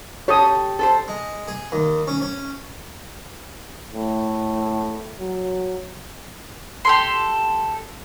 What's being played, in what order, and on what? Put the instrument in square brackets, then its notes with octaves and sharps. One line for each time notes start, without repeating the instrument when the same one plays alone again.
[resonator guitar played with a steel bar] G4 A4 [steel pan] C#5 D#6
[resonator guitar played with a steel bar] A4 B4 C5
[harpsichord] G#3
G#4
D#2
C#4
C#4
[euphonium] A2
F#3
[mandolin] G4 A4 C6